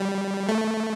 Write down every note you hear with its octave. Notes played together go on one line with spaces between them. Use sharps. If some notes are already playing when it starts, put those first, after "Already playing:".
Already playing: G3
A3